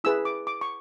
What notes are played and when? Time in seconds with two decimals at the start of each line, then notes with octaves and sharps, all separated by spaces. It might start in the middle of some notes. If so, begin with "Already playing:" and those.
0.04 E4 G#4 B4 E6
0.25 D6
0.47 D6
0.61 C#6